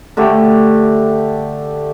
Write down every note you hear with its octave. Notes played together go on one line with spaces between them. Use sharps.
D3 A3 G4